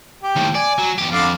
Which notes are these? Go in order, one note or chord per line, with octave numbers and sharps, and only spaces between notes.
G4
D#2 A2
D5 G#5
F#3
E2 G4
F2 D3 D5 F5